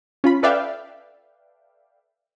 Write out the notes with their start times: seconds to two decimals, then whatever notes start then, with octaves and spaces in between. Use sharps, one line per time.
0.24 C#4 F4 B5
0.43 A4 B4 D5 E5 F5 G5